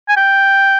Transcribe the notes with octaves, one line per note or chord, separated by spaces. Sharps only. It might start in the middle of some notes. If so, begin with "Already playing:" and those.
G#5
G5